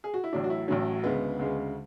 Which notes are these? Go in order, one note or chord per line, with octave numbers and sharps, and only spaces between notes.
G#4
F#4
E4
A1 A2 F#3 D4
F#4
E4
A1 A2 F#3 C#4
D2 C#3 G#3 B3
D2 C#3 G#3